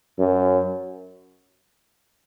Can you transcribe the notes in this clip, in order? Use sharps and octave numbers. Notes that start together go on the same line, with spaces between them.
F#2